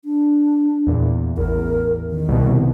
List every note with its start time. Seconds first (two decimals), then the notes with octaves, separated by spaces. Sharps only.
0.05 D4
0.87 E2 A#2
1.37 A1 E2 A#4
2.11 D#3
2.29 C2 B2